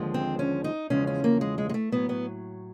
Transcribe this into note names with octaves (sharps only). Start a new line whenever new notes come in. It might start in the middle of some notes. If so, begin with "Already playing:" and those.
Already playing: D#2 D3 F3 G#3
C4
C#4
D#4
E2 C#3 F3 G#3 C#4
C#4
A#3
G#3
G#3
G#3
A3
A2 F#3 B3
B3